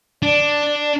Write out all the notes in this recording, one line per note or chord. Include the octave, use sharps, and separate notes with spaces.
D4 D5